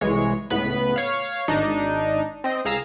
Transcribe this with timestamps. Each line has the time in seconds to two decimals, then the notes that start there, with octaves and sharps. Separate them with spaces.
0.01 C2 E3 G#3 C#5
0.50 C#2 A2 B3 B4 B5
0.96 C#5 F5
1.48 G#1 D4 D#4
2.44 C4 D#5
2.65 C#2 G#4 F5 A#5 E6 E7